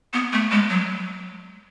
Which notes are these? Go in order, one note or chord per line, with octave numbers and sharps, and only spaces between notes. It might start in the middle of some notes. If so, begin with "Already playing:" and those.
B3
A3
G#3
F#3